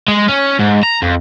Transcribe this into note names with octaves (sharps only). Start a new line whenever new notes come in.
G#3
C#4
G#2
A#5
F2